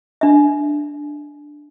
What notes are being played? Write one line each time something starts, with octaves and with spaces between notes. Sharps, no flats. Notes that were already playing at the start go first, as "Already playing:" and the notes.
D4 E5